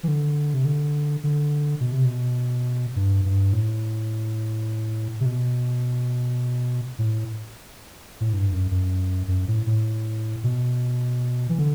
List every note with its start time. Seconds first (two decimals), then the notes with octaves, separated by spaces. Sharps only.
0.03 E3
0.08 D3
0.54 C3
0.65 D3
1.24 D3
1.80 B2
1.92 C3
2.05 B2
2.96 G2
3.25 G2
3.53 A2
5.20 C3
5.26 B2
6.99 A2
8.21 A2
8.33 G2
8.52 F#2
8.71 F#2
9.28 F#2
9.48 A2
9.67 A2
10.44 B2
11.49 E3
11.59 D3